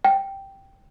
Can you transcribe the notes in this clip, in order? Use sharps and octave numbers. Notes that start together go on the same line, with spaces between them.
G5